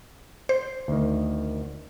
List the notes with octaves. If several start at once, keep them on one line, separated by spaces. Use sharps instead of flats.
C5
D2 D#3